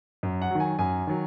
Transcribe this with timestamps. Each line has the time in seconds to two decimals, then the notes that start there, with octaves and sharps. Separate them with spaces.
0.23 F#2
0.42 F#5
0.51 D#3 F#3
0.60 G#5
0.79 F#2 G#5
1.07 D#3 F#3